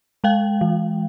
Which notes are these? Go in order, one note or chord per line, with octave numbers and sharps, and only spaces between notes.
G#3 F5 G5
E3